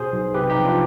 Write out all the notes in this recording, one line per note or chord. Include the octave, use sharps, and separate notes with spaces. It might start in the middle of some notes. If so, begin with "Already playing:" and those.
Already playing: B2 G#4 C5
B1
C3 G4 B4
D#4 G4
F3
D4 F4